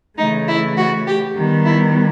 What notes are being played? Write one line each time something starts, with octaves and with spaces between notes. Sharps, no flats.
C#3 E3 A3 D#4
E4
F#4
G4
D#3 G3 B3
E4